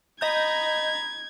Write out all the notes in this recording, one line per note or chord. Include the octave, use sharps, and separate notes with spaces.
D#5 A#5 B5 G6 G#6